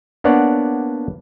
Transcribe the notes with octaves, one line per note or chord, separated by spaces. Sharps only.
A#3 B3 D4 C#5 D5 F#5